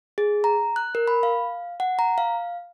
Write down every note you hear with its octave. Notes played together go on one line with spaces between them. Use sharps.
G#4
A#5
F#6
A#4
B5
F5
F#5
A#5
F5